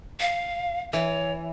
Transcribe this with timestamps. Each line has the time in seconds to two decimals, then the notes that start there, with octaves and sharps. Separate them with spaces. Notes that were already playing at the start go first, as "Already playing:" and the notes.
0.20 F5
0.93 E3 C#5